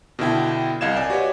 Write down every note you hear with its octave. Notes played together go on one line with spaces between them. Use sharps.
B2 D3 E4 G5
C2 D#5 F5 G#6 E7
D5 G#5
F#4 G4 B4 C#5 D#5